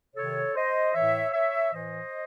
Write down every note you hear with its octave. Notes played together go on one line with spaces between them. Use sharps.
C3 D#3 A4 C#5
C5 D#5
A2 E3 C#5 E5
C#5 E5
A2 E3 C5 D#5